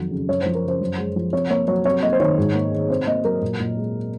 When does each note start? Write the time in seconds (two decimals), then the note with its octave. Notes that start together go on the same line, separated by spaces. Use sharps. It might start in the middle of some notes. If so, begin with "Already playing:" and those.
Already playing: F2 D#3 F#3
0.11 C#3
0.28 F#2 C#5
0.41 C5
0.46 F3
0.55 A#4
0.64 C#3 C5
0.81 F#2
0.98 G#3
1.16 F3
1.33 C3 C#5
1.50 A#3 C#5
1.68 F#3 C#5
1.85 C3 C#5
2.03 A#3 D#5
2.13 C5
2.20 D#3 C#5
2.38 G#2
2.55 A#3
2.72 D#3
2.90 C3 C5
3.07 A#3 D#5
3.24 F#3 A#4
3.42 A#2
3.60 A#2
3.77 G#3